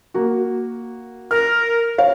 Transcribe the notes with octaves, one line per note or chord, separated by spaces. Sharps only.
A#3 F#4
A#4 F6
C#5 F5